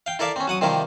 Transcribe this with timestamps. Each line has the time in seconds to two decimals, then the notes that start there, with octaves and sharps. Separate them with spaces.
0.06 F5 G5
0.19 E4 A4 A#4 D5 E5 F5
0.36 C4 C#4
0.47 F#3 F#5 D#6
0.61 C3 D#3 F3 G3 E4 A#4